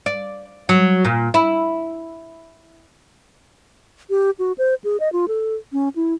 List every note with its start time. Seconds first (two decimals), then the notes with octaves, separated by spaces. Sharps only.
0.06 D5
0.69 F#3
1.05 A#2
1.34 E4
4.10 G4
4.39 F#4
4.58 C5
4.84 G#4
5.00 D#5
5.13 F4
5.28 A4
5.73 C#4
5.96 E4